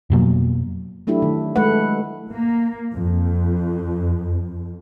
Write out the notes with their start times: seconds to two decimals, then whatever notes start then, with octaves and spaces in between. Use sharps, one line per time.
0.10 F2 B2 F#3 A#3
1.07 F#3 A3 D4 E4 G4
1.22 D#3
1.56 G#3 A3 B4 F#5
2.31 A#3
2.92 F2